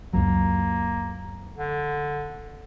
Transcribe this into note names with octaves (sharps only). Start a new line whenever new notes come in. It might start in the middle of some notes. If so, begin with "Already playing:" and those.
C#2 F#2 F#3 A#3
D3